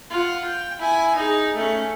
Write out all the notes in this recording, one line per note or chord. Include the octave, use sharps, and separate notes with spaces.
F4 F#5
G5
E4 G#5
D#4 G#4
A3 C#4